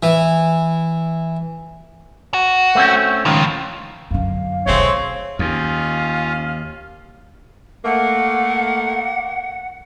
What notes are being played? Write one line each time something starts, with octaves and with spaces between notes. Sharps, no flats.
E3
F#4
A3 C4 C#4
C#2 A2 D#3 F3
F#2 D3 F5
E1 D3 G#3 A3 C4 C#5
D#2 C#4 F4 F5
A3 A#3 F#5